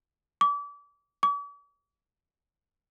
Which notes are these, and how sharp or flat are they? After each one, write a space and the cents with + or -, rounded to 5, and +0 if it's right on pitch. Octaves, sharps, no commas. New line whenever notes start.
D6 -35
D6 -45